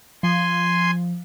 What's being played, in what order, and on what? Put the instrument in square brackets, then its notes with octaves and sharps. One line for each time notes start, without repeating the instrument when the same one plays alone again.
[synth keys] F3 [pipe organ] G#5 C6